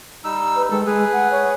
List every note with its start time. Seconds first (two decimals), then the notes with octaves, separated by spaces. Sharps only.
0.24 G3 D#4 E6
0.56 B4
0.71 D#3 G#3 A4
0.86 G#3 G#4 B4
1.13 F#5
1.31 C#5